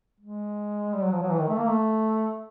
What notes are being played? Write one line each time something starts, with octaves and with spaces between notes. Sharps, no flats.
G#3
G3
F#3
F3
F#3
E3
D#3
A3
A#3
A3